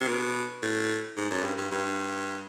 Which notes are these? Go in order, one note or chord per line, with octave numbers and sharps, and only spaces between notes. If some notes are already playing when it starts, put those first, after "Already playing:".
C3
B2
A2
G#2
F#2
G2
G2
G2